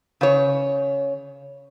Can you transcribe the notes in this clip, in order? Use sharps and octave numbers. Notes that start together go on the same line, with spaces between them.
C#3 C#5